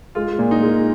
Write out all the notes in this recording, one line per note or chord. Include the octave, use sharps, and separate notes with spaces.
G#3 F4
A#2
D#4
G#3